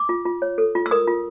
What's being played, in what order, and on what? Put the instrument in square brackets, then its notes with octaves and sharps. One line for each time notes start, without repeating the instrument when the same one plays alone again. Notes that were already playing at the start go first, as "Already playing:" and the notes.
Already playing: [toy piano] D6
F4
F4
C#5
A4
F4
E6
A#4 D#6
F4